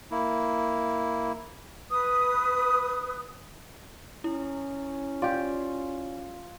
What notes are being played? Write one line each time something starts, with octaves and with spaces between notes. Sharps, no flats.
A#3 E4
B4 D#6
C#4 E4
F4 G4 D5